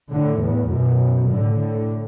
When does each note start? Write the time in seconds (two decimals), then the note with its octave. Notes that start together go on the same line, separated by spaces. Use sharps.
0.11 A2 D3
0.40 E2 A2
0.71 F#2 B2
1.30 A2 D3
1.60 A2 D3